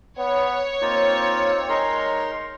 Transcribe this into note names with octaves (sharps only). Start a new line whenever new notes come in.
B3 C#5
A#3 C4 D#4 F4
G#3 D#4 A#4 C6